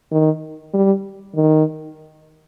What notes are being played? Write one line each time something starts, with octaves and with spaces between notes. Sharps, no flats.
D#3
G3
D#3